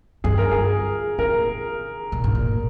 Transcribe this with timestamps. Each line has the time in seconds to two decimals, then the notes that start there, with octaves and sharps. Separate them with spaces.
0.24 G2 G#4
0.38 A#4
0.51 G#4
1.18 A#2 A#4
2.12 A#2
2.24 G#2
2.35 A#2